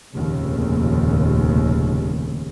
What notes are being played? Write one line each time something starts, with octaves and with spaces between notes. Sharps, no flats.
F1 D#2 A#2 C#3